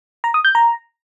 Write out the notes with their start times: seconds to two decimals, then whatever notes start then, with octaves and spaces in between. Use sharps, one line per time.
0.24 A#5
0.34 D#6
0.45 G6
0.55 A#5